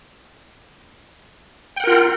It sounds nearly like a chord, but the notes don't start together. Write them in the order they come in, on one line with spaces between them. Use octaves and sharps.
G5 F#5 A#4 F4